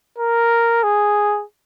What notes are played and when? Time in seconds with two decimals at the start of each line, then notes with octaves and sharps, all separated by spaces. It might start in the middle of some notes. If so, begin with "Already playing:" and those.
0.18 A#4
0.83 G#4